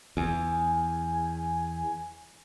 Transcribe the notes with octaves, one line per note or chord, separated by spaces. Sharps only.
E2 G#5